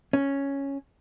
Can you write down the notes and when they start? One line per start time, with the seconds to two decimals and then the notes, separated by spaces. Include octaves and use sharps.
0.13 C#4